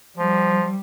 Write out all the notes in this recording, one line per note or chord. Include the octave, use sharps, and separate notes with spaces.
F3 G3